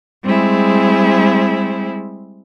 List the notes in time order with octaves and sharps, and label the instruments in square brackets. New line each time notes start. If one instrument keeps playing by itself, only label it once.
[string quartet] G3 G#3 C4 E4 G#4